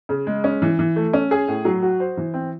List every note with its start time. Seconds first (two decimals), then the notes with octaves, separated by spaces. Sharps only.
0.09 C#3
0.27 G#3
0.44 C#4
0.62 E3
0.79 E3
0.96 A3
1.13 C#4
1.31 G#4
1.48 A2
1.65 F#3
1.82 F#4
2.00 C5
2.17 E3
2.34 C4